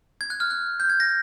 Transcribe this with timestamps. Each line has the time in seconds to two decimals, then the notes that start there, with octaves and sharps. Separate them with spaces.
0.21 G#6
0.30 F#6
0.40 F6
0.50 F#6
0.80 G6
0.90 G#6
1.00 A#6